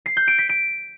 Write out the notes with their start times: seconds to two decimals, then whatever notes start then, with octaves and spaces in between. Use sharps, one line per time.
0.06 C7
0.17 G6
0.28 D7
0.38 B6
0.49 D7